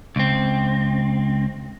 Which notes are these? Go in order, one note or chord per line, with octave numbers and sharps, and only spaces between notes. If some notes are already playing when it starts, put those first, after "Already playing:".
C#2 C4